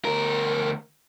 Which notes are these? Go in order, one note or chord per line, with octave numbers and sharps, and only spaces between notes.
D2 A#4